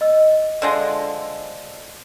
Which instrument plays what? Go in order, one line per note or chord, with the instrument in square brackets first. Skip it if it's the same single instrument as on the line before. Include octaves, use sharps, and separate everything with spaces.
[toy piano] D#5 E6
[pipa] D3 F3 G#3